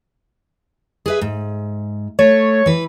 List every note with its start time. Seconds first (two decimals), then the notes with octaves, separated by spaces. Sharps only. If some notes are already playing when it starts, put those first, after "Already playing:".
1.06 G#4 B4 E5
1.21 G#2
2.19 A3 C#5
2.66 E3 B4